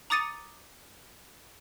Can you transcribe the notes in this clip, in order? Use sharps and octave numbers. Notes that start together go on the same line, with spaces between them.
A#5 D6 D#6 A6 C#7 D#7